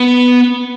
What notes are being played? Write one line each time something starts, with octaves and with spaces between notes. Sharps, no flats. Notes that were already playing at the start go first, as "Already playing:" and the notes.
Already playing: B3